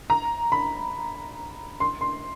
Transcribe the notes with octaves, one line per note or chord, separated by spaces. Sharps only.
A#5
B5
C6
C6